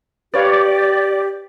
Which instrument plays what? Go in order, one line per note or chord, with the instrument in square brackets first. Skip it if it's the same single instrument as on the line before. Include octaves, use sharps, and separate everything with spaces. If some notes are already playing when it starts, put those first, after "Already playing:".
[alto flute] G4 [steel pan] B4 C#5 F5 [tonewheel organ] D5